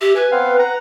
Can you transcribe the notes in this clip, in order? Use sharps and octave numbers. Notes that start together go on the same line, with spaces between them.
G4 E5
B4 G#5
B3 C4 F5
F#5 A#5